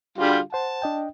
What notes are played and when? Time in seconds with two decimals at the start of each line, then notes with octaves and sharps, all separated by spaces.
0.18 D3 G3 F4 F#4 G#4
0.53 C5 F#5 A5
0.82 D4 D#5 G5